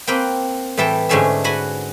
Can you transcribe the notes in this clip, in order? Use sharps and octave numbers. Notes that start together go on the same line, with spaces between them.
A#3 C4 B4 G5
A2 E3 E4 G5 A5
G#2 D3 A3 C#4 E5
F#4 B4 F#5 G#5